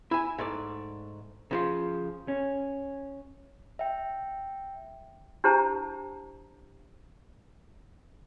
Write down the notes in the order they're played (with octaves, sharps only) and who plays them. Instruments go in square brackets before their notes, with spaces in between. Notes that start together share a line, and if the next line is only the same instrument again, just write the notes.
[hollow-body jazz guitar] E4 G#5
G#2 A3 D5
C#3 F3 F4
C#4
[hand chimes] E5 G5
[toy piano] D4 E4 G4 C5 A5 A#5